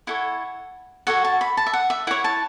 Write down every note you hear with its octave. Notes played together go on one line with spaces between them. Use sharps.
E4 A4 C#5 F#5
F#4 A4 C#5 F#5
A5
B5
A5
E5
F#5
E5
E4 C#5 F#5
A5